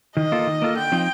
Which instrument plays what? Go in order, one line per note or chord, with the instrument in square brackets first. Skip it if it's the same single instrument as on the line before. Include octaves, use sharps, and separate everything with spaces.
[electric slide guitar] D#3 [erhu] D#5
[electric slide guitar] A#3 F4 A4
D#3
A#3 F4 A4
[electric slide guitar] D3 [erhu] G5
[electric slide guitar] F3 C4 D#4